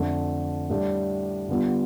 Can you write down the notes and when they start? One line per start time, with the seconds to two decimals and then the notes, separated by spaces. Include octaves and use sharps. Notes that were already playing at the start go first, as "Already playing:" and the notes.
Already playing: F2 D3 A3
0.70 A2 G3 D4 A4
1.48 D3 G3 B3 F4